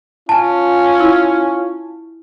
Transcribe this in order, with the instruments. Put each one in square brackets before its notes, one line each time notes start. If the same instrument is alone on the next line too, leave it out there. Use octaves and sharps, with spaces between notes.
[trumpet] C#4 [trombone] F4 [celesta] G#5 A5
[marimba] E4